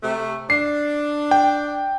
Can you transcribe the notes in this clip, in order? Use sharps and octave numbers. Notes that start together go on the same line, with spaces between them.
C3 A3
D4 C7
G5